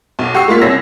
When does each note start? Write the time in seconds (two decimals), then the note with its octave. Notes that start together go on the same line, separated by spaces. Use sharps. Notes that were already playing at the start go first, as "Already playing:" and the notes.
0.19 B1
0.34 G4 F#5 C#6 E6 C7
0.48 G#3 A#3 F4 B6
0.61 C2 C#4 E6 A#6